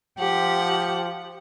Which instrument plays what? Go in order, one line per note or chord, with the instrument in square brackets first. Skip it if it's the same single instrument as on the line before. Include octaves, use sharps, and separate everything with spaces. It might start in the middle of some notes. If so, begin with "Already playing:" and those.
[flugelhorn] F3 [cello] G4 [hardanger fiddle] F#5